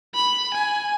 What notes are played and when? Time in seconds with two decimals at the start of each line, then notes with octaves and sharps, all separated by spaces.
0.15 B5
0.54 G#5